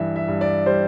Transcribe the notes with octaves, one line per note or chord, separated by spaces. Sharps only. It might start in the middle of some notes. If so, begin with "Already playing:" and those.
Already playing: G2 E3 E5
E5
G2
D5
G3 C5